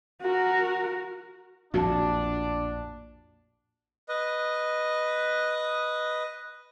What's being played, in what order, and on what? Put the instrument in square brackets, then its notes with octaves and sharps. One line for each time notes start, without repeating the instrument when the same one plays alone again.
[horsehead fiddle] F#4 A#4
[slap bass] A#1 F2 A2 [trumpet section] D4 [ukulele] F#4 A5
[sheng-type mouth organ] B4 D#5